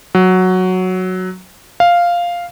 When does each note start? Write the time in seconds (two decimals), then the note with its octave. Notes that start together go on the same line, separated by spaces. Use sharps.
0.15 F#3
1.80 F5